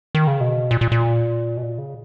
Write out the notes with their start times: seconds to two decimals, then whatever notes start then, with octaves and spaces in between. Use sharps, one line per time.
0.15 D#3
0.27 C#3
0.41 B2
0.71 A#2
0.81 A#2
0.92 A#2
1.57 B2
1.63 A#2
1.78 C#3